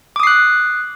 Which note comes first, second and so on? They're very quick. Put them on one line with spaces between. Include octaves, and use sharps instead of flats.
D6 D#6 C7 F#6